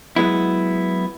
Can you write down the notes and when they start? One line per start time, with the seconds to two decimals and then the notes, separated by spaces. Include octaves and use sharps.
0.16 F#3 G#3 B3 E4